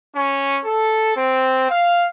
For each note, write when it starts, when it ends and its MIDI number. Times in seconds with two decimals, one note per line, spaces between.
0.16 0.60 61
0.65 1.15 69
1.17 1.68 60
1.70 2.07 77